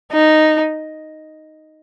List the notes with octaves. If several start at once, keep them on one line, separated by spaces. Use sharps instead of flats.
D#4